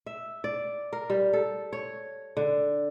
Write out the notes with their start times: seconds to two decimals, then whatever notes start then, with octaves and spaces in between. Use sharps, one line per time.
0.06 E5
0.44 D5
0.93 A#4
1.10 G3
1.33 A4
1.73 C#5
2.37 D3